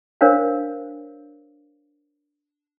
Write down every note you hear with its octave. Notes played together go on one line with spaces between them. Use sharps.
D4 A#4 C5 C#5 F5